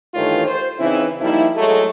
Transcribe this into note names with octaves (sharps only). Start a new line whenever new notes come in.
G2 D#3 E3 A3 F4 C#5
C5
C#3 E3 C4 D#4 E4
F3 G3 A#3 D#4 E4
F#3 G#3 A3